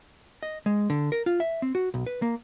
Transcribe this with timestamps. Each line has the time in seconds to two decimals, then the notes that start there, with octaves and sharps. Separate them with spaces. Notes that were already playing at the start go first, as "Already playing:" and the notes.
0.43 D#5
0.66 G#3
0.90 D3
1.12 A#4
1.26 F4
1.40 E5
1.62 C4
1.75 F#4
1.94 B1
2.07 B4
2.22 A#3